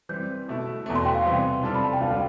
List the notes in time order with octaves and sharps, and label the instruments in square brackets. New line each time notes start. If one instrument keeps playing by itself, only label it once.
[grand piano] E3 G3 C4 [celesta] G6
[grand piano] B2 A3 E4
E2 B2 A3
[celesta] C6
G5
F5
[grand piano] C3 E3 G3
C3 G3 D4 F4 A4
[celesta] B5
A5
G5
[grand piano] D2 D3 G3 B3 F4 [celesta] F5